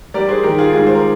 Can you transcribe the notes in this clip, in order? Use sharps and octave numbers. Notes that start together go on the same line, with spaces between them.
G3 A#4 D5
G#4 C5
D#3 G4 A#4
F4 G#4
G#2 F4 G#4
C5
A#4